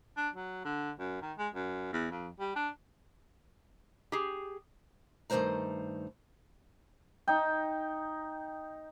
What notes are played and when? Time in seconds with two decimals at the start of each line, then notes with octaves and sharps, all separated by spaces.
0.17 D4
0.34 F#3
0.65 D3
0.99 F#2
1.22 D#3
1.38 G#3
1.54 F#2
1.93 E2
2.10 F2
2.40 G3
2.56 D4
4.12 G4 G#4
5.30 G2 D#3 F3 A3 C5 A#5
7.27 D#4 G5